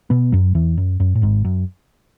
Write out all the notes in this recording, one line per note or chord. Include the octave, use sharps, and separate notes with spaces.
B2 B3
F#2 F#3
E2 E3
F#2
F#2
A2
G#1 G#2
F#2